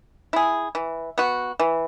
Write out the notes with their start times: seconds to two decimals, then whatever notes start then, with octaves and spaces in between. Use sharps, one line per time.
0.33 E4 G#4
0.75 E3
1.18 B3 F#4
1.60 E3